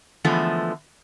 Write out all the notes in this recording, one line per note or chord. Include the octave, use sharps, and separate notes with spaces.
D3 E3 F3 G#3 A3 B3